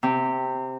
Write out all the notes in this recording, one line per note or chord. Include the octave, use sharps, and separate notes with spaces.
C3